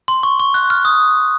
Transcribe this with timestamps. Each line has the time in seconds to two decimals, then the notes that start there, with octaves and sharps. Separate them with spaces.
0.08 C6
0.23 C#6
0.40 C#6
0.54 F#6
0.70 F6
0.85 D#6